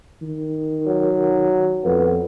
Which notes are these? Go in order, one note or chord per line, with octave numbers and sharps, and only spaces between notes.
D#3
F#3
F2 B3